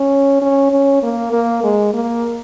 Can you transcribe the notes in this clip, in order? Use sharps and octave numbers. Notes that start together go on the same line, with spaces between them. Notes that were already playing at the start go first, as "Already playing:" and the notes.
Already playing: C#4
C#4
C#4
A#3
A#3
G#3
A#3